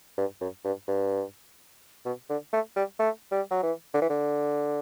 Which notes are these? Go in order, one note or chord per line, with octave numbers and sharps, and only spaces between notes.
G2
F#2
G2
G2
B2
D3
A3
G3
A3
G3
F#3
E3
D3
E3
D3